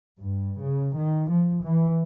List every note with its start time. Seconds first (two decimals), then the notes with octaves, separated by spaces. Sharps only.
0.21 G2
0.64 C#3
0.97 D#3
1.31 F3
1.64 E3